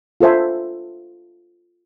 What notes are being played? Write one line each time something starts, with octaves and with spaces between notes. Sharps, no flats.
F4 A4 C5 E5 G#5